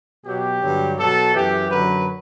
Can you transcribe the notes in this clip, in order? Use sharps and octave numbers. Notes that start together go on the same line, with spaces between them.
B2 F#3 G4
G2 D3 F#3
B2 F#3 A4
F#2 E3 G4
F#2 D3 F#3 B4